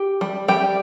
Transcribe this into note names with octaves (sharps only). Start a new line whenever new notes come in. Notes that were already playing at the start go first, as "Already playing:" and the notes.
Already playing: G4
G3
G3 G4